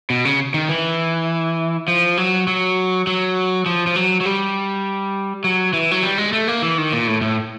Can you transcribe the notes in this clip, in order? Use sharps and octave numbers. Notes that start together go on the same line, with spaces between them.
B2
C#3
D#3
E3
F3
F#3
F#3
F#3
F3
F3
F#3
F#3
G3
F#3
E3
F#3
G3
G#3
A3
A#3
E3
D#3
A#2
A2
A2